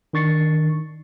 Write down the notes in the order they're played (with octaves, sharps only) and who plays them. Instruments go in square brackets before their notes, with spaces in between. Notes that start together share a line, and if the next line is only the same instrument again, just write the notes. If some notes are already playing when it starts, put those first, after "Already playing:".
[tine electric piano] D#3 D4 C#6 A6 C7 C#7